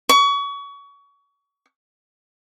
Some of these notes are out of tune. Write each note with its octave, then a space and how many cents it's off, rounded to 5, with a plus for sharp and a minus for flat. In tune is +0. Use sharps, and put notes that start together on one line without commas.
C#6 +30